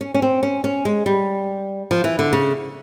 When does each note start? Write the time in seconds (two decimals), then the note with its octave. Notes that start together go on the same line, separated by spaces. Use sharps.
0.01 C#4
0.14 C#4
0.22 C4
0.43 C#4
0.64 C#4
0.85 G#3
1.06 G3
1.91 F3
2.04 E3
2.19 D3
2.33 C#3